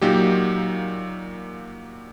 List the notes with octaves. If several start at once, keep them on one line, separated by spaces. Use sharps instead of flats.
A#2 F#3 A#3 D#4 G4